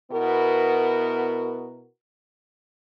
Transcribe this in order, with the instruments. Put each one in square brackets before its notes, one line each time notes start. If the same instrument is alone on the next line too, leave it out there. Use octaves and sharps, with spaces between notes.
[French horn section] B2 B3 E4 F#4 A#4